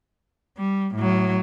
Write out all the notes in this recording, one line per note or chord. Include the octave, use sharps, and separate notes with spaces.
G3
A2 F#3